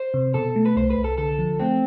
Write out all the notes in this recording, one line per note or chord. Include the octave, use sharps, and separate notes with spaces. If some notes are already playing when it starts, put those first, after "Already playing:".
Already playing: C5
C3
B2 A4
A3
B4
C2 C5
B4
C2
A4
D3 A4
F3
A3 C4